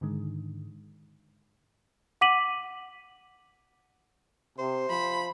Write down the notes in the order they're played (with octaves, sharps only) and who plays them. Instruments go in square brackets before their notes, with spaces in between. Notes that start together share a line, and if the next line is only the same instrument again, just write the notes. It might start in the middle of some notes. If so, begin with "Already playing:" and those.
[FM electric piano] G#2 D3 D#3 G#3
[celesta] F#5 D6 B6 D#7 F#7
[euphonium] C3 [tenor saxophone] C5
[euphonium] F3 [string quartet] B5